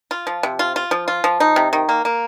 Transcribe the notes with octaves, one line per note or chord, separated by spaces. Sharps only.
F4
F3
C3
F4
F4
F3
F4
F3
D#4
C3
D#3
A#3
A#3